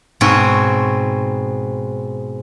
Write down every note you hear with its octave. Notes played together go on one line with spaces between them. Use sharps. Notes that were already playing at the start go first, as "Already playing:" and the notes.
G#2 B2 C4 C#5